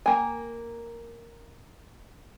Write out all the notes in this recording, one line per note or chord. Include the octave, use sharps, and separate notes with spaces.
A#3 G5 G#5